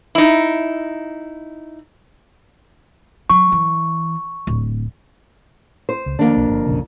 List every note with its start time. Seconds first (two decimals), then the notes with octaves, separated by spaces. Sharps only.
0.15 D#4 E4
3.30 F#3 C#6
3.52 E3
4.47 D1
5.89 C5
6.06 C#2
6.19 F2 D#3 A#3 D4
6.36 B1
6.50 G1
6.66 E1 A#1 C#3